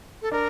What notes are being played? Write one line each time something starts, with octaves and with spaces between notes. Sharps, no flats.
A4
D4 A#4